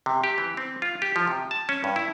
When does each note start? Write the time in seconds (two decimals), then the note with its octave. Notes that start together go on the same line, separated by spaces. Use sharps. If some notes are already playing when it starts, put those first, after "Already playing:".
0.06 C3
0.24 G4
0.38 E3
0.57 C4
0.82 F4
1.02 G4
1.16 F3
1.27 C3
1.51 A5
1.69 C#4
1.84 G2
1.96 E4